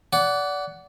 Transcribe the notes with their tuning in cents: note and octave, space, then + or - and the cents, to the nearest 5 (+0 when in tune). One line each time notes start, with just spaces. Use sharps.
D5 -25 F#5 +10